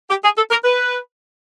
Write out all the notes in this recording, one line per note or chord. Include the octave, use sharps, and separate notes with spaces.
G4
G#4
A4
A#4
B4